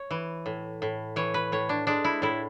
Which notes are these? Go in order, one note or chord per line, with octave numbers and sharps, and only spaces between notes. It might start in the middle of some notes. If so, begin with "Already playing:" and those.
Already playing: C#5
E3
A2
A2
E3 C#5
B4
A2 C#5
D4
G#3 D4
E4
A2 E4